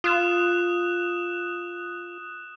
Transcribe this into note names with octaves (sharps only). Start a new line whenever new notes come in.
F4 D#6 F#6 E7